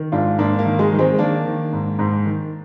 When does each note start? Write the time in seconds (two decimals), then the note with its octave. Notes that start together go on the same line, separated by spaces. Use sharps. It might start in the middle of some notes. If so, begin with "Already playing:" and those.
Already playing: D#3
0.12 G#2 D4 F4
0.38 G#2 A#3 D4
0.59 A#3
0.66 D#3
0.79 G#3
0.92 D#3
0.99 G#3 C4
1.18 D#3 A#3 D4
1.46 D#3
1.73 G#2
1.99 G#2
2.26 D#3